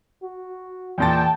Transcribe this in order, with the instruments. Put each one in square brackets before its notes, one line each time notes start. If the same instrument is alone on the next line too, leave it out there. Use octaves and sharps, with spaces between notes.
[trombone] F#4
[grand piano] E2 A#2 A6 [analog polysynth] G5 A5